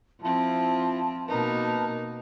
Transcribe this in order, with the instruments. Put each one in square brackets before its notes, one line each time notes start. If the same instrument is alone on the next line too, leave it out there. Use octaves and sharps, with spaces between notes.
[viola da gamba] F3 C4 [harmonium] E4 F4 [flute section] A5
[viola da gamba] B2 A#3 D#4 [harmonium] A#4 B4